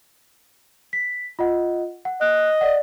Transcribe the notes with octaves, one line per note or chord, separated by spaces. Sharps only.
B6
F4 D#5 F#5
F#5
D#5 F#6
D5 F#5